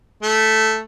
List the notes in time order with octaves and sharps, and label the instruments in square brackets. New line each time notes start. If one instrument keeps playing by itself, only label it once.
[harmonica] A3